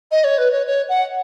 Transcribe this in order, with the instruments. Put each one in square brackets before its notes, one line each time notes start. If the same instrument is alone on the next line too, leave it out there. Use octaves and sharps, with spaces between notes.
[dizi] D#5
C#5
B4
C#5
C#5
F#5